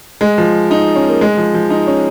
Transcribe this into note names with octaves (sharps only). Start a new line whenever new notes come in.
G#3
F3
D#4
C#4
A#3
G#3
F3
F3
D#4
C#4